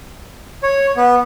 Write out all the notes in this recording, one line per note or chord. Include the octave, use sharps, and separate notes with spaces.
C#5
B3